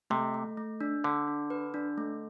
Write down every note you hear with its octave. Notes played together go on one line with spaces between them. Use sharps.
C3 A3
A3
A3
D4
D3 D4
D4
B4
D4
A3